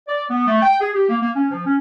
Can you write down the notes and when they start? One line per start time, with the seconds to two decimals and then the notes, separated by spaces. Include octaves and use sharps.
0.08 D5
0.30 B3
0.47 A3
0.63 G5
0.81 G#4
0.94 G4
1.09 A#3
1.22 A#3
1.35 C#4
1.51 F3
1.66 C#4